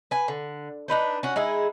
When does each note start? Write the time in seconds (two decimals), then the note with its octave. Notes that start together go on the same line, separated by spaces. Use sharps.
0.11 B4 G#5
0.28 D3
0.88 D4 D#4 B4 C5
1.23 C#4 F#4
1.36 G#3 D#4 E4 G#4